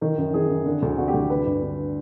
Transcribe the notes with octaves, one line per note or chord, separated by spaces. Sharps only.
D#3 A#4
F#2
D#3 G#4
F#2
D3
D2
D3 F#4
G4
D2
D3 B4
G2
D3